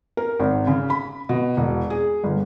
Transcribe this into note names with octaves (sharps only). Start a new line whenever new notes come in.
A#4
G#1
C#3
B5
B2
E1
G#4
G1